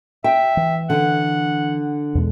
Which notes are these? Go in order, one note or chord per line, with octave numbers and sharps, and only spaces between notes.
E5 G5
E3
D3 F#5
E2 B2 G#3